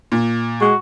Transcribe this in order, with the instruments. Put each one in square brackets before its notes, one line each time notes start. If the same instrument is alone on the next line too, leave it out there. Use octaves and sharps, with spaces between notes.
[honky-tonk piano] A#2
[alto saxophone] G#3 [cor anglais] F#4